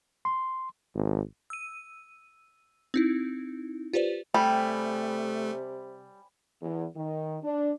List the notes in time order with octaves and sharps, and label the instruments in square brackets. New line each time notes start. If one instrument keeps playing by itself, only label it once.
[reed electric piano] C6
[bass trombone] G#1
[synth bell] E6 D#7
C4 D#4 E4
F4 G4 B4 C5 D5
[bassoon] C3 [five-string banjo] G3 [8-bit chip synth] A3 [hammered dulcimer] G5 G#5 B5
[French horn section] E2
D#3
D4